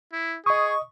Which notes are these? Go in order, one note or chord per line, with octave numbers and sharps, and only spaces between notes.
E4
G#4 D#5 C#6 D#6